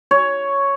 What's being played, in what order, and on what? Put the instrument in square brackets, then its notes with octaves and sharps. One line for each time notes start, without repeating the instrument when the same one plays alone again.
[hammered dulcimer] C#5